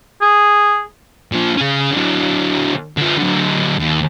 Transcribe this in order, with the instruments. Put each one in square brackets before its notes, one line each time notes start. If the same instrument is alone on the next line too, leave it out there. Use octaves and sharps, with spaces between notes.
[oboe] G#4
[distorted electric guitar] A#2 F3
C#3 C#4
D3 F#3
D3 F4
D3 F#3
D#2